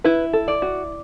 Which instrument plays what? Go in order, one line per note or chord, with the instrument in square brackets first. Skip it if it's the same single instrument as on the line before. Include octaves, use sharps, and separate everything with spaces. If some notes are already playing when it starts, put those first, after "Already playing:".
[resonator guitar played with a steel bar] E4 [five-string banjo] B4
[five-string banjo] A4
[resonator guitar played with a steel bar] D5
[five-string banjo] F#4